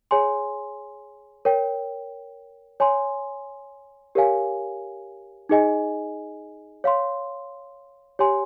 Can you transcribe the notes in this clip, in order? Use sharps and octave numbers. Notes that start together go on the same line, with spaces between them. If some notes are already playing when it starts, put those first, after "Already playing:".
G#4 C#5 G#5 C6
A#4 C#5 G5
C#5 G#5 C6
G4 A#4 C#5 F5 G#5
D#4 G#4 D#5 G#5
C#5 F5 C6
G4 C#5 G#5 C6